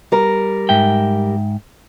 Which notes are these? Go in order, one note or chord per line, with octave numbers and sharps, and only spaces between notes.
G3 A#4
G#2 E5 G5